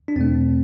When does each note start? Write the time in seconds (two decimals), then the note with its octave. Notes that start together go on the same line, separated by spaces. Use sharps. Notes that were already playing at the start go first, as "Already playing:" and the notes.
0.08 D4
0.16 E2 B2 A3 C4